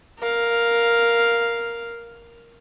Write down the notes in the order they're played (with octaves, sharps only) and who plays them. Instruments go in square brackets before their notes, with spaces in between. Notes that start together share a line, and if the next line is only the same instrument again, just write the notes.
[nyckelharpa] A#4 F5